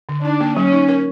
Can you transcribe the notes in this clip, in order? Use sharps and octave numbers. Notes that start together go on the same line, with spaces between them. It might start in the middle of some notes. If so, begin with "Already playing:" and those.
D3
D4 D#4
A#3
F#3 C#4
D#4
A#4